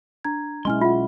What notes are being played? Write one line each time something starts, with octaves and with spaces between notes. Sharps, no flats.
D4 A#5 G#6
B1 G#3 C#4 E4 D#5 G#5 C6 F6
F4 E5 F#5